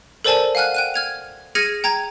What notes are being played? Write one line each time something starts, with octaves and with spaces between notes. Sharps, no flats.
A4 A#4 C5 D5 G#5 A5
F5 F#5 G#5 F6 F#6
G5 F#6 D#7
F6 G#6 F7
G#4 F6 G#6 A#6 C#7 D#7
G5 A#5 G#6